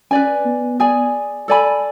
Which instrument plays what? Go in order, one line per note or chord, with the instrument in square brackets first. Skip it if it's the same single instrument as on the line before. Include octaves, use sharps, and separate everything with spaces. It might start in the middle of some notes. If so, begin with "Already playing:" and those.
[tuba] C#4 [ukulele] B4 D5 G#5
[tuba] B3
[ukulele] G#4 D5 G#5
A4 D5 G#5 B5